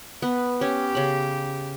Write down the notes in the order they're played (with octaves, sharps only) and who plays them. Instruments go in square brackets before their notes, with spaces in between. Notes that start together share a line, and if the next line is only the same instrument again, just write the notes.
[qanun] B3 [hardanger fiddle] B4
[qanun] C#4 [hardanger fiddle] G4
[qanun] C#3 B5